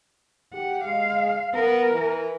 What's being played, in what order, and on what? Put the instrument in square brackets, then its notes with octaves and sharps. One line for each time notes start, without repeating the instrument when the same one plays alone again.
[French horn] G4 [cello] F#5
[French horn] G#3 [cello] F5
[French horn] B3 [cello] A#4
[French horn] E3